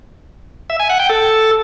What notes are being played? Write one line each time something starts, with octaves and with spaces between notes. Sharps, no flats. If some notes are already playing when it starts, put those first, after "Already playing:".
E5
G#5
F#5
G5
A4